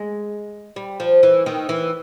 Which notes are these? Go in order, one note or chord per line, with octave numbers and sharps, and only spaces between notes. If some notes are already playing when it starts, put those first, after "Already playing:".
Already playing: G#3
G3
F3
E3
D#3
E3